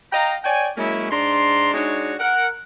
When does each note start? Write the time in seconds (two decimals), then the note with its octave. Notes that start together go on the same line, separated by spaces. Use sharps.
0.12 D#5 F5 G5 A#5
0.44 C#5 D5 G5 G#5
0.77 F#3 G#3 A#3 C#4 E4
1.10 G#2 D4 A#5 C6
1.73 G#3 D4 D#4 F#4 C#5
2.19 A#4 F#5